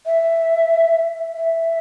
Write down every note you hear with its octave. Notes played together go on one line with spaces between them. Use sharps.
E5
E5